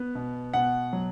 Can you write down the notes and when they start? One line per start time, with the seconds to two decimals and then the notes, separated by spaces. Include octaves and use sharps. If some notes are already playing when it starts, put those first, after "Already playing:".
Already playing: B3
0.15 B2
0.54 B2 F#5
0.93 F#3